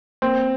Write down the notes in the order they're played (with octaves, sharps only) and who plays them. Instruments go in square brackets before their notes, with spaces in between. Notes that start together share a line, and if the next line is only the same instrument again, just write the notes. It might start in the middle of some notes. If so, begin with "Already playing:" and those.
[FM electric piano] A#3 [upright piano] C4